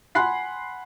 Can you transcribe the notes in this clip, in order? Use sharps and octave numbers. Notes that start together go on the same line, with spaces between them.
F#5 G#5 B5 C6 F#6 C7